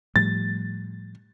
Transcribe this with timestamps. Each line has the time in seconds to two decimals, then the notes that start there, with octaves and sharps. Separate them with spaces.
0.16 A2 F3 G3 A6